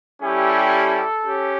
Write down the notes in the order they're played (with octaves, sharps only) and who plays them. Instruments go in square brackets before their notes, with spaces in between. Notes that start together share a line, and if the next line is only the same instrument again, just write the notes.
[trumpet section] G3 C#4 E4 G4 A4
C#4 G4